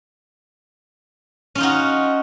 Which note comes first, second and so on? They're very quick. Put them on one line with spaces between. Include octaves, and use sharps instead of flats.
C#4 F4 D#4 F#4